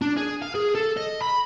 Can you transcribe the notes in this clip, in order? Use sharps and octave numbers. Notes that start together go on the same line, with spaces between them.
D4
G#4
F5
G#4
A4
D#5
B5